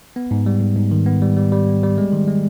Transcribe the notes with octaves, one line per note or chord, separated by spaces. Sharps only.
B3
G#2
G3
G#2
G#2
D#3
B3
G3
G3
G3
B3
G3
G#3
D#3
G#3